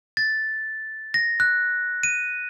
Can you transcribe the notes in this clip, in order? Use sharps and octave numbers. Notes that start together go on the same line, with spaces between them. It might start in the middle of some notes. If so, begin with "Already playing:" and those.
A6
A#6
F#6
D#7